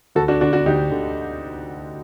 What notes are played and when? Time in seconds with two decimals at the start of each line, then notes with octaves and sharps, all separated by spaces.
0.15 D2 F#4 A4
0.28 D4 F#4
0.41 D3 D4 F#4
0.53 D4 F#4
0.66 D2 D#4 G4
0.91 D3